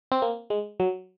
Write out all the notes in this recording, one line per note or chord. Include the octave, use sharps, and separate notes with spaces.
C4
A#3
G#3
F#3